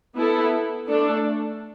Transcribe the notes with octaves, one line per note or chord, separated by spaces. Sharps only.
B3 E4 A4
A3 D4 A4